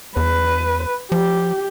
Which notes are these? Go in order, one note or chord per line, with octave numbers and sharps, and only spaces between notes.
E2 B4
F3 G4